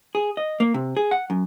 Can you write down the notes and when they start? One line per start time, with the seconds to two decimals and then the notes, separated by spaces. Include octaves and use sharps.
0.15 G#4
0.37 D#5
0.60 A#3
0.74 C3
0.97 G#4
1.11 F#5
1.30 F#2